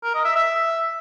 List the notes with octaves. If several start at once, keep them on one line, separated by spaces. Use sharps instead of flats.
A#4
D#5
E5
E5